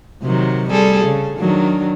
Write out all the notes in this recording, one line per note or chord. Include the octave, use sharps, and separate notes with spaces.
C3 D#3 F#3
G3 G#4 A4
C#3
D#3 F#3 D4